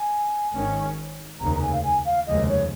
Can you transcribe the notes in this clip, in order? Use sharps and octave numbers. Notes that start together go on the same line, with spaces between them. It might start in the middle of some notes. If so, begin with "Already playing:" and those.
Already playing: G#5
G#1 G#2 D#3 C#4
F1 D#2 C#3 A#5
A#5
G#5
F5
G#5
F5
F1 D#2 C#3 F3 G#3 D#5
C#5